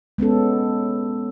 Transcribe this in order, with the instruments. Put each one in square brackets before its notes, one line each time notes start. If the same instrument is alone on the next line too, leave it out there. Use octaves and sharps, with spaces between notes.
[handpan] G#3 B3 C#4 A4